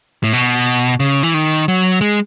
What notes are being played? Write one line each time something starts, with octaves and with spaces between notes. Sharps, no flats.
A2
B2
C#3
E3
D#3
F#3
G#3